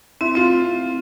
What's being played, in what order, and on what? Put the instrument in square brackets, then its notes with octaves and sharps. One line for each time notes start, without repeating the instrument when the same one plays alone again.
[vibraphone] C4 [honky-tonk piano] E4
[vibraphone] C4 [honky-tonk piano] F4